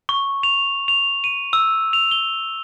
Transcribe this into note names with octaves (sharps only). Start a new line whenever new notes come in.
C#6
F7
F7
D#7
E6
F7
G7